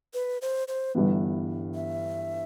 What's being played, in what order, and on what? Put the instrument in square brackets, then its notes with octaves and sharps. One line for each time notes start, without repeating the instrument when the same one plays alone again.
[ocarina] B4
C5
C5
[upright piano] G1 G2 E3 B3
[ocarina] E5